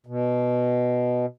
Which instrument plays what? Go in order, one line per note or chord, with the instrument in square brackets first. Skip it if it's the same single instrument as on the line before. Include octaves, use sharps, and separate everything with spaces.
[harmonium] B2